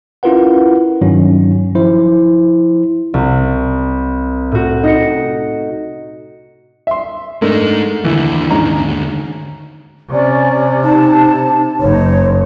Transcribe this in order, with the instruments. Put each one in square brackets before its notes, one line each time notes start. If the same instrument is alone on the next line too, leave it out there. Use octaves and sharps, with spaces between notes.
[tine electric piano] C#4 E4 F4 A#4 B4 F#5
G2 D#3 F#3 C#4 D#4
F3 E4 C5
[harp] C2
A2 F#4
D#4 A#6 C#7
[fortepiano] E5 C6
[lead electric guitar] G#3 D#4 [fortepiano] A3 D4 A#4
[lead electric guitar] D#2 D3 [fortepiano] E3
[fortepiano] G#2 C#4 A#5
[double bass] C3 [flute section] C#4 D5
[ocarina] D#4 [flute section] A5
[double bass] F#1 [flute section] D#4 [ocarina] C#5